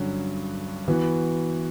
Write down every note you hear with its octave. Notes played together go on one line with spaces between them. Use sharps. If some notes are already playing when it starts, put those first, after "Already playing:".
Already playing: G2 D3 F#3 C#4
E3 B3 F#4